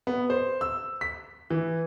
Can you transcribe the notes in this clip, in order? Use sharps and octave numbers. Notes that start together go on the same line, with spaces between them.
B3
C5
E6
B6
E3